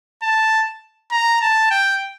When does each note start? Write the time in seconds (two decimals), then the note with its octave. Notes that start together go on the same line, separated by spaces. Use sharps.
0.22 A5
1.11 A#5
1.41 A5
1.71 G5